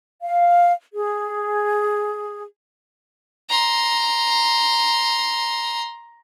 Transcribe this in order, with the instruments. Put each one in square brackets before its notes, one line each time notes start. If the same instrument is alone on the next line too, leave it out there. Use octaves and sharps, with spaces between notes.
[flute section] F5
G#4
[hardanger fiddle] A#5 C6